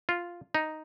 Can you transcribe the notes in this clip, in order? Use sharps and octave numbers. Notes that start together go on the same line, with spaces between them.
F4
D#4